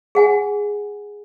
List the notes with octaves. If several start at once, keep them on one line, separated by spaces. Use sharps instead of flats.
G#4 F#5 G#5